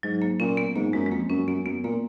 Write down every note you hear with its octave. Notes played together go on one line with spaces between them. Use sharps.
G#2 F#3
A#3
A#2 C#4
B3
G#2 A#3
F#2 G#3
G#3
F2 A#3
F#2 C#4
F#2 B3
F#2 B3
A#2 A#3